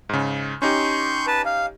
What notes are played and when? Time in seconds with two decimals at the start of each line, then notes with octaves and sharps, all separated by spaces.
0.09 G#2 C#3
0.62 C#4 D#4 G4 C6 C#6 G6
1.27 B4 A5
1.45 F5